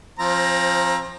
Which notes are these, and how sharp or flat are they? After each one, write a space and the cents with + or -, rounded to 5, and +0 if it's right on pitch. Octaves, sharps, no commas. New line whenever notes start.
F3 +0 C4 +30 A#5 +10